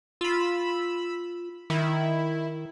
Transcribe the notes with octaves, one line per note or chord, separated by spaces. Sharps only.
F4 B5 E6
D#3 E4